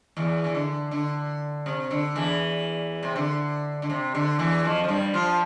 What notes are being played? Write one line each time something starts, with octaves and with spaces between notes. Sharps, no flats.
E2 E3
E3
D3
D3
C3
D3
E2 E3
C3
D3
D3
C3
D3
E2 E3
F2 F3
F3
G2 G3
F3 F4